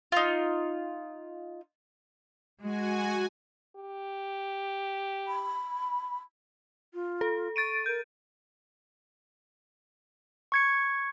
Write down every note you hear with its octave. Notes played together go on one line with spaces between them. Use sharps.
D#4 F4
G#3 F#4 G#5
G4
B5
F4
A4
C#6 A6 D7 D#7
A#4 G6
C#6 G#6 C#7